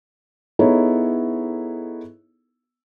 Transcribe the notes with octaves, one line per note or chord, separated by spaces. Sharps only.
B3 D#4 E4 G#4 A4 C#5